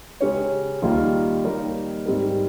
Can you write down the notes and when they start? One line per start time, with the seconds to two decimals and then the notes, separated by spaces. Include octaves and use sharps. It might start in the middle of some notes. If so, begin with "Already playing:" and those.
0.21 C#3 G#3 C#4 G4 C#5
0.82 D#2 D#3 G3 A#3 F4
1.44 G3 A#3 D#4 A#4 C#5
2.06 G#2 G3 C4 G4 A#4